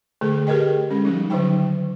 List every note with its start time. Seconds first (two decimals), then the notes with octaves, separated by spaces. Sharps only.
0.21 D3 A3 G#4 A4
0.47 G4 G#4 A#4 B4 D#5 G5
0.90 G#3 C#4 A4
1.05 F3 G3 C#4 D#4
1.30 D3 D#3 F#3 D#4 G5